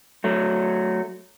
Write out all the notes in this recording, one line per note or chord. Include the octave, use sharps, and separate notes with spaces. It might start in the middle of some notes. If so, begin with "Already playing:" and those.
F#3 A3